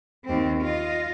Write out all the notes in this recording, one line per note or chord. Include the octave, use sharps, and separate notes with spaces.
D#2 C4
F4 D#5